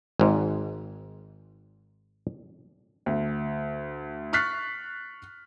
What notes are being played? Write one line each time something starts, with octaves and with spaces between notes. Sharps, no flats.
G#1 G#2
D2
C#6 F6 F#6 A6 B6 C7